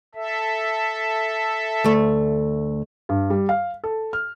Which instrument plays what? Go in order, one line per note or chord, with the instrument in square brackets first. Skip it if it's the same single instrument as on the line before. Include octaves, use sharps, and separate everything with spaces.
[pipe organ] A4 E5
[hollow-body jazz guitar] D2 A3
[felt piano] G2
G3
F5
A4
F6